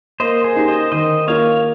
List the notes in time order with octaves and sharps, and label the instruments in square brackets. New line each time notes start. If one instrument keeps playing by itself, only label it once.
[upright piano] A#3 [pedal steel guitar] C5 D#5
[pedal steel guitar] G#4 C5
[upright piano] D#4 G4
[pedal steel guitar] C5 D#5
[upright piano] D#3 [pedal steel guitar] C5 D#5
[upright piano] A#3 F4 [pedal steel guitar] C#5 F5